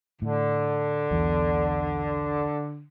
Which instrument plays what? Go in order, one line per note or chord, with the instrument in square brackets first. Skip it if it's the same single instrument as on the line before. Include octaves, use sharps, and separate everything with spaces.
[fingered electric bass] A2 [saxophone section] D3
[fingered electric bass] B1 E2 B2